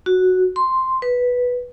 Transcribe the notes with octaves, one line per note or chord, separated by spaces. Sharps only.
F#4
C6
B4